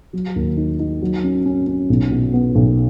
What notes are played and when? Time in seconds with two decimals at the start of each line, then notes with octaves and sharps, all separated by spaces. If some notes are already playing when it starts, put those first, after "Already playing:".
0.13 F#3
0.36 D#2
0.57 D#4
0.79 D#4
1.02 F#3
1.24 C#4
1.45 C#4
1.67 C#4
1.89 B1
2.11 B2
2.33 B3
2.55 B1